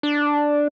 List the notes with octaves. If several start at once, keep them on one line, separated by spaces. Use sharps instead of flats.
D4